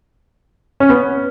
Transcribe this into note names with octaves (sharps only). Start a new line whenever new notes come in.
C#4
B3